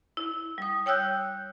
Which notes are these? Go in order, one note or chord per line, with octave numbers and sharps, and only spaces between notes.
E4
G3 D#6
C#5 G5 E6 F#6 G6